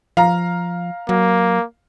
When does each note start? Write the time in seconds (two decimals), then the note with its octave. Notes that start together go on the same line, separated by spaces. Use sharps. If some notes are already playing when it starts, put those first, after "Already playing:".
0.17 F3 F5 A#5
1.09 F#3 A#3